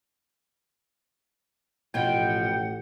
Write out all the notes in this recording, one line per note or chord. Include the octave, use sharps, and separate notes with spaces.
A1 B2 F3 F#5 G5